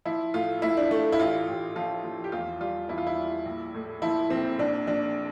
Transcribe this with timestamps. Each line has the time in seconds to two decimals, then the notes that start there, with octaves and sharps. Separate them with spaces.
0.05 F3 E4
0.34 A2 F4
0.62 A2 E4
0.77 D4
0.91 A2 A3
1.12 E4
1.19 A1 F4
1.48 A1
1.76 F3 F4
2.04 F3
2.24 G4
2.32 E2 F4
2.60 G3 F4
2.89 E2 E4
2.98 F4
3.07 E4
3.17 G3
3.45 A#1
3.74 A2
4.02 F3 E4
4.30 A#1 C4
4.59 A#1 D4
4.87 A#1 D4